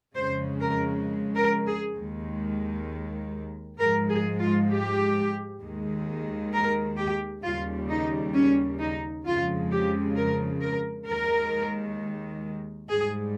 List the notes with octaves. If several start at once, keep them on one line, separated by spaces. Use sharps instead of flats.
F2 C#3 G#3 C5
A#4
A#4
G#4
D#2 D#3 G#3
G#2 F3 G#3 A#4
G#4
F4
G4
D#2 D#3 G#3
A#4
G4
D#2 C#3 G3 F4
D#4
C#4
D#4
F2 C#3 F3 G#3 F4
G4
A#4
A#4
D#2 D#3 G#3 A#4
G#2 G3 G#4